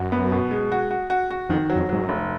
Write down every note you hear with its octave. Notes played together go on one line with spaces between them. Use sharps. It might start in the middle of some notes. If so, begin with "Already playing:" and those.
Already playing: F#2 F#4
B3
B2
G#3
F#4
F#4
F#4
F#4
F2 D#3
F#3
F2
G#2 F#3
F#2
F1